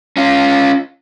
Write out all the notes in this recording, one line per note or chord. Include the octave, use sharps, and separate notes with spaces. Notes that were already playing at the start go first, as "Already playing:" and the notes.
C#4 F4